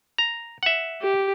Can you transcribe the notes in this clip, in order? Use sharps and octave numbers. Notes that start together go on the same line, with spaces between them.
A#5
E5 F#5
G4